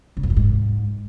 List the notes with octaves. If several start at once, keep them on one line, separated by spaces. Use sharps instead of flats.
C#3
F2
G2
G#2